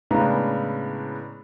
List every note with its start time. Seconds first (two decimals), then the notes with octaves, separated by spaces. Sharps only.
0.11 A2 C#3 G#3 B3 D4 A#5